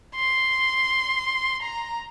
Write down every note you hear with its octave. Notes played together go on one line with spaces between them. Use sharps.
C6
A#5